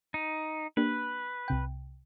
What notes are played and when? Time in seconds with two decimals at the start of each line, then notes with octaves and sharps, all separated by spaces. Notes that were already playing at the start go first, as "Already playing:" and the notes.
0.14 D#4
0.77 A#3 D4 G4 B4
1.48 C2 C3 G5